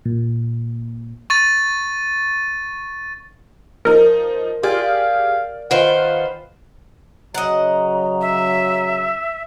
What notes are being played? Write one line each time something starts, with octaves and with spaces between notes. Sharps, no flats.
A#2
C#6 A6 D#7
F3 D#4 A#4
F4 G4 G#4 D5 F6
F5
D#3 F4 B4 C5 F#5
C#3 F#3 D#5 F#5 A#5
E5